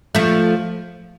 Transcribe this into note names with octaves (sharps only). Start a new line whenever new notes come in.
F3 A3